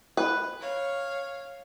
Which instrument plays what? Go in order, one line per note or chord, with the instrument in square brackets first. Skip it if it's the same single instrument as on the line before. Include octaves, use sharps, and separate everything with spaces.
[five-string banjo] B4
[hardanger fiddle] C#5 F5